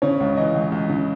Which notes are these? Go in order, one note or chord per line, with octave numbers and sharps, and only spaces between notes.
C#3 C#5
C#2
E3 D#5
C#2
C#2
C#3